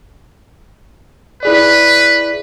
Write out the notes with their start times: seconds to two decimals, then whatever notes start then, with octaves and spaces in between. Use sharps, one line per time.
1.43 E4 G#4 B4 D5